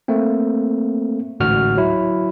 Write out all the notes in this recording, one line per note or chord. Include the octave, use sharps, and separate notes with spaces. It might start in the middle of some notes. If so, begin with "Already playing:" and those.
A3 A#3 C4
A1 D2 G#2 F#4 F6
F#3 E4